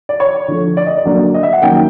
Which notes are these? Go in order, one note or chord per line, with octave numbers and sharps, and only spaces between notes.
D5
C#5
D3 F3 A3
D5
D#5
D5
D3 F#3 A#3 D4
D#5
E5
F#5
D#3 F#3 A#3 C#4 G5